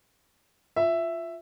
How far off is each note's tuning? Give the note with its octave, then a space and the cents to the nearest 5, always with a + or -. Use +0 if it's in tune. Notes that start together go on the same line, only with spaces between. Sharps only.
F4 +0 E5 +5